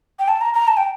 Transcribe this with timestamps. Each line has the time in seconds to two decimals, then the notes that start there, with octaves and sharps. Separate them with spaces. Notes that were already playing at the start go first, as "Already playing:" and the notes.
0.19 G5
0.28 A5
0.41 A#5
0.54 A#5
0.68 A5
0.77 G5